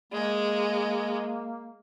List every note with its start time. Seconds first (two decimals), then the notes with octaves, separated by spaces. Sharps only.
0.13 G#3 A#3